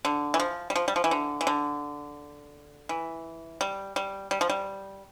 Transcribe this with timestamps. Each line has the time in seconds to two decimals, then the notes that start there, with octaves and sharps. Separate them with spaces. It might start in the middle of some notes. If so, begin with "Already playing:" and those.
0.05 D3
0.34 E3
0.40 F3
0.70 G3
0.76 F3
0.88 G3
0.96 F3
1.04 E3
1.11 D3
1.41 E3
1.47 D3
2.89 E3
3.61 G3
3.96 G3
4.31 G3
4.41 F3
4.50 G3